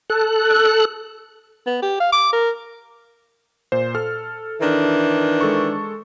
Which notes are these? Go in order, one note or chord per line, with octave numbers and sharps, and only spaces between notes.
A4 F#6
B3
G4
F5
D6
A#4
A#2 C5
A4 F6
D#3 E3 D4
G#3 A4 C#6